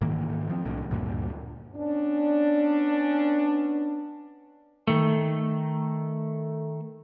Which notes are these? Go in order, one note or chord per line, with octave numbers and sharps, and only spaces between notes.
G#2 D#3 E3 A#3
F3 C4
B1 A2 D3
D2 G2 A#2 D3
B3 C#4 D4
D#3 A3